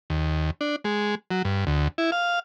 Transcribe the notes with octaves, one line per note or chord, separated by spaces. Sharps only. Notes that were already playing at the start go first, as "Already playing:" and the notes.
D#2
D4
G#3
F#3
G2
D2
E4
F5